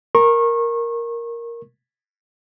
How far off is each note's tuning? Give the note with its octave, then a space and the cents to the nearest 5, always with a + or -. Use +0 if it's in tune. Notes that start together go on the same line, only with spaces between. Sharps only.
A#4 +0 C#6 -30